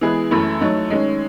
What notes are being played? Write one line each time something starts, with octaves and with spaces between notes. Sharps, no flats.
E3 G#3 B3 E4 G#4
F#2 E3 A3 E4
F#3 A3 D#4
D#3 G#3 C#4